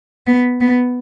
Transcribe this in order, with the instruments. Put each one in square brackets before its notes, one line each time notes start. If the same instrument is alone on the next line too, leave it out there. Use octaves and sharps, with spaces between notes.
[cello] B3
B3